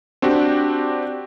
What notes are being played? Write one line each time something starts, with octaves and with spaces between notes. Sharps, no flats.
C4 D4 F#4 G4